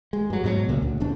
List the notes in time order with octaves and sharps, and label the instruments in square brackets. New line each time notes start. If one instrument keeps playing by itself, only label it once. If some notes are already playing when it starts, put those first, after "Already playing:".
[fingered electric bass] G#3
G2 F#3
G#2 B2 F3 F#3
C#2 A#2 C#3
D2
D1 B1 F2 D4